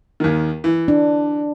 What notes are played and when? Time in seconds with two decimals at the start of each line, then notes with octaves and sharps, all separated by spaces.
0.20 D#2 D#3
0.64 E3
0.88 D4